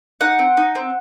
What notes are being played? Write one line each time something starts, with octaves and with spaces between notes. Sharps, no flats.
D#4 F#5
C4
D#4
C4